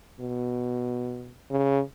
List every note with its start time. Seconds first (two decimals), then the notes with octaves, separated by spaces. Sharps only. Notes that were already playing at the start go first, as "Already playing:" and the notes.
0.20 B2
1.51 C#3